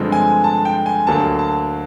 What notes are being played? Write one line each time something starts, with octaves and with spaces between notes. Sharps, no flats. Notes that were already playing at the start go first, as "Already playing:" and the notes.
Already playing: G2 D3 F3 G#3 C4
G#5
A5
G5
G#5
D2 D3 F#3 A#3 A5
A5